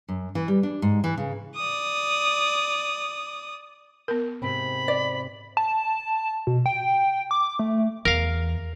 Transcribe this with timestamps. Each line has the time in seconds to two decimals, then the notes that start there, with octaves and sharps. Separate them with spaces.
0.08 F#2
0.35 E3
0.48 G3
0.63 D4
0.82 G#2
1.04 E3
1.17 C#3
1.56 D5 D#6
4.08 B3 A#4
4.42 G#2 C3 C4 B5
4.88 D5
5.57 A5
6.47 B2
6.66 G5
7.31 D6
7.59 A3
8.05 E2 A#4 F5